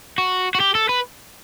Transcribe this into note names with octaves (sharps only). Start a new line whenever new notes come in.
F#4
F#4
G4
A4
B4